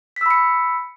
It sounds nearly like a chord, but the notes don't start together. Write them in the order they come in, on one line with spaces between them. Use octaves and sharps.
B6 E6 B5 C#7